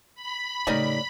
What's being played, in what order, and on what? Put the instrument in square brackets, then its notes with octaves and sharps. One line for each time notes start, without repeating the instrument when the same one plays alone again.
[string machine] B5
[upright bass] A2 C#3 [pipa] G3 D#4 A#4 [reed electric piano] A3 C#5 D5